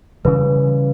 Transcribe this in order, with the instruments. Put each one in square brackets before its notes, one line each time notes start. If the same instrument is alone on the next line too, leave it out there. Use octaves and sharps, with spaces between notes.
[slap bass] C#3 E3 G3 [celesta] B4